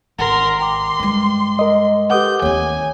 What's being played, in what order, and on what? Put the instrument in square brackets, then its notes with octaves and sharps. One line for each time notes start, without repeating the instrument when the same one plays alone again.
[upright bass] G#1 [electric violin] A#4 C6 [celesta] F#5
[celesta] G5 A#5 D6 [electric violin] C6
[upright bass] G2 G#3
[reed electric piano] A#4 D#5
[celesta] G4 A4 B4 [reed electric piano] F#5 D6 D#6 [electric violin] G6
[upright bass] D#2 C4 [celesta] C#5 [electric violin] G#5